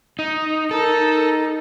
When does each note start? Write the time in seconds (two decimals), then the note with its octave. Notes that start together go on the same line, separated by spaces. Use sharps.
0.19 D#4
0.71 D#4 A4 A#4